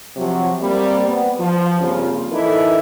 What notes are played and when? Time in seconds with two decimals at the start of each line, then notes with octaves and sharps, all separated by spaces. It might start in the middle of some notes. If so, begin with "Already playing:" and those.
0.16 C3 F3 F#3
0.61 G3 A#3 C4
1.06 B3
1.39 F3
1.79 G2 C#3 A#3 C4 F4
2.31 E3 D#4 E4 A4 A#4 D5